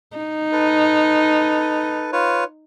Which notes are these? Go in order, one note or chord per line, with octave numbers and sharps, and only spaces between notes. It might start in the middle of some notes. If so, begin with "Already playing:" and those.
D#4
A4 B4
F4 B4 C#5